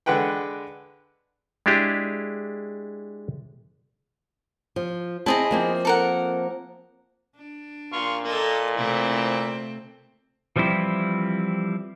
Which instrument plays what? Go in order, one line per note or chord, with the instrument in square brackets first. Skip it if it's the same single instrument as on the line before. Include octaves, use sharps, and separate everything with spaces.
[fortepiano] D3 G#3 B4 F#5 G5
[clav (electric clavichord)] G#3 D4 E4 G4 G#4
[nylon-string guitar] F3
[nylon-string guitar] C4 A5 [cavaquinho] E4 G#4 D#5
[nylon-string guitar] F3 A#3 C4
[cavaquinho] A4 A#4 F#5
[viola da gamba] D4
[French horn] A#2 [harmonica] F5 C6 C#6
[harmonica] A#3 [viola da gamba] A4 D#5
[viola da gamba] C3 A3 C4 [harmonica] E3 E4
[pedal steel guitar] E3 F3 G3 C4 E4